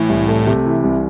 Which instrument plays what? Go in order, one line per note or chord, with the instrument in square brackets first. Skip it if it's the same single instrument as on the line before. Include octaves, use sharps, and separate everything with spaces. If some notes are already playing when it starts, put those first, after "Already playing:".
Already playing: [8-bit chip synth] A2 [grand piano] E3
[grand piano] C2
A3
C3
E3
C2